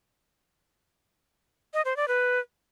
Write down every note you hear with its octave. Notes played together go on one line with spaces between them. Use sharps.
D#5
C5
D5
B4